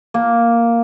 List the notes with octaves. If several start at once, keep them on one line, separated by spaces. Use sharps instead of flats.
A#3